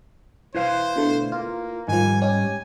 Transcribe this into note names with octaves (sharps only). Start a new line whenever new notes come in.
E4 B4 C5 F5
B2 D3 A3
A#3 F4
G#2 D#3 F3 G3 G#5
C#4 D#4 G4 G#5